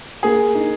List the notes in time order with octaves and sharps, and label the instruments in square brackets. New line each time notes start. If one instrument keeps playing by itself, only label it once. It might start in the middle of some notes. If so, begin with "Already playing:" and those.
[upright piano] A#3 [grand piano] G#4
[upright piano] D#4